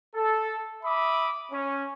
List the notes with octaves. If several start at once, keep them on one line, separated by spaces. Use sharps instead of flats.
A4
E5 B5 D6 D#6
C#4